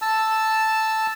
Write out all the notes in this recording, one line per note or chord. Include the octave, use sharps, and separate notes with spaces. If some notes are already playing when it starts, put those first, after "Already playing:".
A5 E6